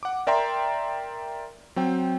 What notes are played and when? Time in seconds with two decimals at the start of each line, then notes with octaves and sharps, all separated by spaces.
0.03 F#5 D6
0.27 A#4 D5 E5 G5 A#5 C6
1.76 F#3 C4 G5